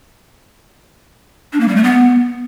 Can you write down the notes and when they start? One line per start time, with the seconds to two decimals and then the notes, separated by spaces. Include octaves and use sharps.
1.53 D4
1.60 A#3
1.68 G3
1.76 A3
1.84 B3